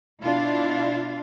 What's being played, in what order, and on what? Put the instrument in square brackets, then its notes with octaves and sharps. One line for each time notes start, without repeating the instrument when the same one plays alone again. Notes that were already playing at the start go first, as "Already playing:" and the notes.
[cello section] B2 D4 E4 F4 F5